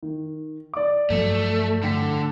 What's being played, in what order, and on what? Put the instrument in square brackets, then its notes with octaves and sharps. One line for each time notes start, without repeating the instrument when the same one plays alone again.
[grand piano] D#3
D5 D6
[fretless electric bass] G2 F3 F#3 [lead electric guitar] A3
[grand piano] A2 G5 B6 [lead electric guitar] D3